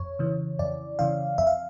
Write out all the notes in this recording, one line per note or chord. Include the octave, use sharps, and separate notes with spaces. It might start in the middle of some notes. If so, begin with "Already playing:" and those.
Already playing: F2 C#5
C#3 E3
F2 D5
C#3 E3 F5
F2 E5
F5